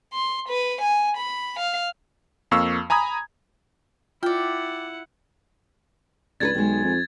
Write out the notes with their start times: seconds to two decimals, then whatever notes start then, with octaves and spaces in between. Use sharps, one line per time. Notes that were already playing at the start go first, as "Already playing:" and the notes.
0.13 C6
0.49 B4
0.82 G#5
1.17 B5
1.59 F5
2.51 F2 A#3 F5 C#6 E6
2.90 G#5 A#5 B5 D#6 G#6
4.23 E4 F4 D5 F#5 G5
6.40 C#2 D4 A4 B4 G#6 A6
6.55 B1 D#3 G#3
6.84 F2